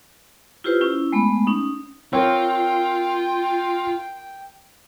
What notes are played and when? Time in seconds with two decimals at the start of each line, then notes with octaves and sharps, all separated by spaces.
0.64 E4 F4 G4 B4 C5
0.81 C#4 E4
1.12 G#3 A3 B3 B5
1.47 C#4 D#4
2.13 C4 F4 A#4 C#5 G5